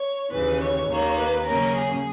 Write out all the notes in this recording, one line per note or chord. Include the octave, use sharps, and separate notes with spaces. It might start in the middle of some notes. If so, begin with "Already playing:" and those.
Already playing: C#5
D#2 C#3 E3 B4
C#5
D#2 D#3 A#3
B4
C#3 F#3 A#3 C#4 A#4
G#4